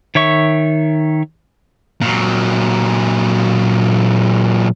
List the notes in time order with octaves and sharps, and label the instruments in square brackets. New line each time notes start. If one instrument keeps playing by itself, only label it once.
[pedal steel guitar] D#3 C#5 E5 C#6
[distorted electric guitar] A#2 F#3